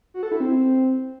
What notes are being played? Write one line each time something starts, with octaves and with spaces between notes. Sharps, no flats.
F#4
A4
E4
C4